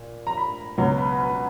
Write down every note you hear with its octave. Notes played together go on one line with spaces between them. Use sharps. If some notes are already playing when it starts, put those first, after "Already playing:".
Already playing: A#2
A#5
B5
C#2 B2 F#3 A#5
B4
B4